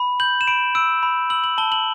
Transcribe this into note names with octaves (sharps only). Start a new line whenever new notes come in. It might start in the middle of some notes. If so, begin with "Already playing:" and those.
Already playing: B5
G6 F#7
E7
B5 D7
E6 D7
B5
E6 F#7
F#7
A5 G7
F#7